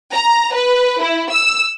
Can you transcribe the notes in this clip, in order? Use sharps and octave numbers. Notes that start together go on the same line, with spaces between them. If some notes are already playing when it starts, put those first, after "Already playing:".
A#5
B4
E4
E6